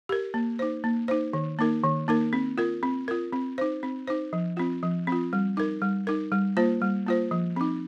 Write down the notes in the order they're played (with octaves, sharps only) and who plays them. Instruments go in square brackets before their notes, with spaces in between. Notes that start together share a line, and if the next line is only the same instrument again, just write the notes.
[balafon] G4 A#4
A#3
D#4 C5
A#3
D#4 C5
D#3
A#3 D#4 A#4
D#3
A#3 D#4 A#4
C4
F4 A#4
C4
F4 A#4
C4
D#4 C5
C4
D#4 C5
F3
C4 F4
F3
C4 F4
G3
D#4 A#4
G3
D#4 A#4
G3
A#3 F4 C5
G3
A#3 F4 C5
F3
C4 D#4